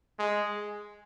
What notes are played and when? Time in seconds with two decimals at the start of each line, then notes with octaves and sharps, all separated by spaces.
0.19 G#3